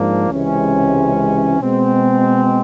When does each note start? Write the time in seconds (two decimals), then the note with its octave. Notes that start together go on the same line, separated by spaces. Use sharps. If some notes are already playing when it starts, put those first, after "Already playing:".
Already playing: G#2 F3 A#3 D4
0.30 C#2 C3 E3 G#3 C#4
1.59 B2 G#3 C4